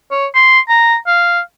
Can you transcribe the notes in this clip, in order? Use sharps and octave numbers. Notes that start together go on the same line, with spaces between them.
C#5
C6
A#5
F5